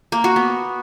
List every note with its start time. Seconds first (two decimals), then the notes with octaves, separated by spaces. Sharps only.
0.12 A#3
0.24 F#4
0.36 B3